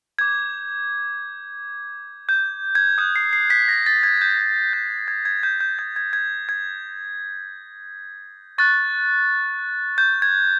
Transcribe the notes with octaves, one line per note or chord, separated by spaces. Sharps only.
D6 G6 G#6
G6
G#6
D#6 F#6 G6
C7
C7
B6
A#6
A6
G#6
G6
G#6
G6
G#6
G#6
G6
G6
D#6 G6 G#6
G#6
G#6
G#6
C#6 F#6 A6
G6
G#6